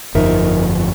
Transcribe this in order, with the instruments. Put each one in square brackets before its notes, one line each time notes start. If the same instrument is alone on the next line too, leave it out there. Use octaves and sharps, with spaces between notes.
[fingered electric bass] G1 F2 F3 [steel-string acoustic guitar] D#4 A#4 E5